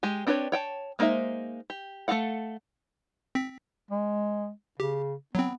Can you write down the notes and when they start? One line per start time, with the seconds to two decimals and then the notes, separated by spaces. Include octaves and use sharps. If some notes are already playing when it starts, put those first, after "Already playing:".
0.03 G#3 G4 G#5
0.27 C4 D4 G4 B4 C#5
0.52 C#5 G5 A5
0.99 G#3 A#3 D#4 C5 E5
1.70 G4
2.08 A3 F#4 A4 F5 F#5
3.35 C4 B6
3.91 G#3
4.80 C#3 G4
5.35 F#3 B3 C4